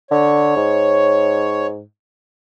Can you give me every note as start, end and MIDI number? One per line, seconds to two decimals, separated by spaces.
0.11 0.57 50
0.11 1.67 73
0.57 1.82 44